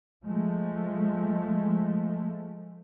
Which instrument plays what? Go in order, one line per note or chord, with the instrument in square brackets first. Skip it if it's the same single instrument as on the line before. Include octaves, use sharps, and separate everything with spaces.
[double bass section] F3 G#3 A3